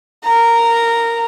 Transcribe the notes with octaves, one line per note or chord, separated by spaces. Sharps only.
A#4 A#5